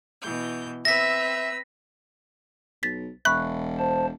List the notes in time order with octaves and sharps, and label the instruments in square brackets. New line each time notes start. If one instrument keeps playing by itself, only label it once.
[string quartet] B2 E3 G6
[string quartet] C4 B4 E6 [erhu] E5 [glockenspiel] A#6 B6
[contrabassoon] B1 [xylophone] A6 B6
[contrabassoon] E1 [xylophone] E5 B5 C#6 [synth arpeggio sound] F#6
[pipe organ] C5 A5